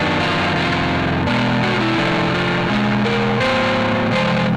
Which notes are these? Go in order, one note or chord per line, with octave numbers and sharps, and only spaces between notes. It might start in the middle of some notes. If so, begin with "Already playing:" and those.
Already playing: F#2 D#3 F#3 B3 D4
F4
F2 C3 D#3 G3 F4
B2 G#3 B3 D4
F#4
F4
E4
C3 F3 A3 D4
F4
B2 G#3 C#4
A#4
A2 F#3 B3 C5
C3 F3 G#3 C5